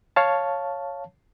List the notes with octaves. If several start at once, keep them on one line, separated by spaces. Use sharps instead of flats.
C#5 F5 A5